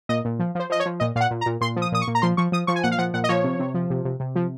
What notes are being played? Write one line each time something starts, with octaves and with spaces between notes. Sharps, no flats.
A#2 D#5
A#2
F3
F3 C5
F3 D#5
C#5
F3
A#2 D#5
A#2 F5 F#5
A#2
A#5
A#2
A#2 C6
F3
D#6
A#2 D#6
C#6
A#2
A#5
F3 C6
F3 C#6
F3 D#6
F3 C#6
G#5
A#2 F#5
F5
F3 F#5
A#2 F#5
D#5
F3 C#5
C3
C3
F3
C3
C3
C3
F3